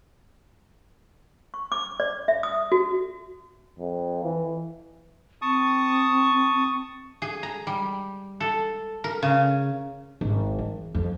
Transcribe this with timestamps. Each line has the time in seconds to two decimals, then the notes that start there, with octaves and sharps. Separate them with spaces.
1.54 C#6
1.72 D6
2.00 D5
2.28 E5
2.43 D#6
2.72 F#4
3.79 F2
4.23 E3
5.42 C4 A5 C#6 D#6
7.22 G#4
7.43 A#5
7.67 G3
8.40 A4
9.04 A#4
9.22 C#3
10.21 G#1
10.59 E3
10.95 F2